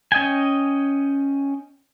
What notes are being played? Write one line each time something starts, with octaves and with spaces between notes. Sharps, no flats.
C#4 D#5 G5 G#5